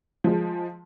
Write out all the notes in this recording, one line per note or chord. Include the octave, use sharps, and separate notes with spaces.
F3 G#3